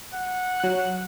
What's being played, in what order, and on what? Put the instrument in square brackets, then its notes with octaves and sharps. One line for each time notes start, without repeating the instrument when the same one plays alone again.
[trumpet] F#5
[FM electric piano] F#3 F#6